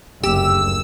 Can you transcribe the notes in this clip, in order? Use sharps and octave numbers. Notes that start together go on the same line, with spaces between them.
F#1 D2 G2 G4 E6